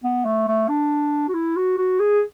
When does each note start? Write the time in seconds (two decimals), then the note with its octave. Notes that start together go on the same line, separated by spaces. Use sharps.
0.04 B3
0.25 A3
0.48 A3
0.69 D4
1.28 F#4
1.34 E4
1.56 F#4
1.78 F#4
2.00 G#4